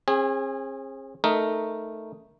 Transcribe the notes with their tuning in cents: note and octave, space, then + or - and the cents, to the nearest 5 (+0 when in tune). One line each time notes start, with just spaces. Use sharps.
C4 +45 G#4 -15
A3 +0 D#4 +0 A#4 +0